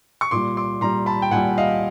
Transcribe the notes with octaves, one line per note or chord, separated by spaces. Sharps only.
C#6
A#2 G3 C6 D6
C6 D6
A#2 G3 A#5 C6
A5 B5
G5
A#2 G3 F#5 G#5
D#5 F5